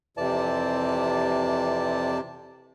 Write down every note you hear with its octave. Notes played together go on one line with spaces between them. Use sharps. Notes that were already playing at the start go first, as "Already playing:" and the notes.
F2 C3 E3 D5 A5